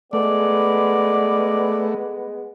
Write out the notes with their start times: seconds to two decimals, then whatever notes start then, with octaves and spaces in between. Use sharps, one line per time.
0.13 G#3 A3 B3 D5